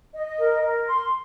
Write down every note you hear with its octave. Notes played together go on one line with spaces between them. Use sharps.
D#5
A#4
A#4
C6